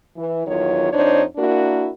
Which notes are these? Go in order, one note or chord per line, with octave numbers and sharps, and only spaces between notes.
E3
E2 D#3 F#3 F4 C#5
F2 D4 D#4 C5 C#5
A#3 D4 E4 F#4 A#4